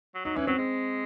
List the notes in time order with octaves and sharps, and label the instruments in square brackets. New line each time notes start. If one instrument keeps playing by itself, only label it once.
[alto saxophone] F#3
[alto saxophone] F#3 [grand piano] D#4
[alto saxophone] E3 [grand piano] C#4
[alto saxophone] F#3 [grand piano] C4
[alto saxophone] G#3